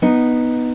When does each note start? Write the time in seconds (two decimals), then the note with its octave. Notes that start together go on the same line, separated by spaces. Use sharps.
0.02 B3 D#4